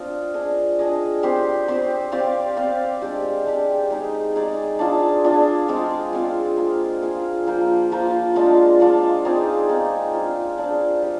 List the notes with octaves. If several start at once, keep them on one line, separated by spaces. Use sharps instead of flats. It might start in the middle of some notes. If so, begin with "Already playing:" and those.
Already playing: C4 D4 F4 C5 D#5
D4 G#4 D#5
D4 G#4 D#5
C4 G4 C5
C4 G4 C5
C4 G4 D5 F5
C4 G4 D5 F5
G#3 D4 G4
G#3 D4 G4
G#3 D#4 G#4 D5
G#3 D#4 G#4 D5
D4 F4 G#4
D4 F4 G#4
G#3 C4 F4
G#3 C4 F4
A#3 F4 G#4
A#3 F4 G#4
F3 A#3 F4 C5
F3 A#3 F4 C5
G#3 D4 F4
G#3 D4 F4
C4 D#4 G#4 D5
C4 D#4 G#4 D5
D4 F4 G#4 C5
D4 F4 G#4 C5
G3